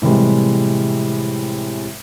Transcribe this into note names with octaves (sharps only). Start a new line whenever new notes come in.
A2 C3 E3 G3 G#3